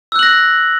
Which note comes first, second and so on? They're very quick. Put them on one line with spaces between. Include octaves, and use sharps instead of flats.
E6 F#6 F#7 A#6